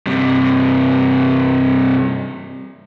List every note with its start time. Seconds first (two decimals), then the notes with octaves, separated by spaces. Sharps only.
0.07 G2 C3